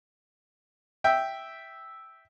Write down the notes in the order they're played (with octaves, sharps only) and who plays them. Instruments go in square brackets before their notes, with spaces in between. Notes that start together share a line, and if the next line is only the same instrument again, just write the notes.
[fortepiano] E5 G5